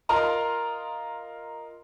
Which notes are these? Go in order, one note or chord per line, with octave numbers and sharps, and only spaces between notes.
F4 A#4 D#5 A#5 C6